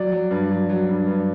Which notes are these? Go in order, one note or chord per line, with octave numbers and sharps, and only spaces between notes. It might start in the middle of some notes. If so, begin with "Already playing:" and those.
Already playing: F#3 D5
F#3
G2
F#3
F#3
G2
G2